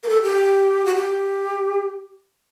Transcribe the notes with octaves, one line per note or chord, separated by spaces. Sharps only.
A#4
A4
G4
F#4
G4